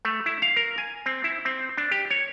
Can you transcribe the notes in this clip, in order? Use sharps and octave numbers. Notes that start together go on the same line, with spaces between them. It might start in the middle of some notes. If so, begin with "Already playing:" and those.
A3
E4
F5
A#4
G#5
C4
E4
C4
D4
G4
C#5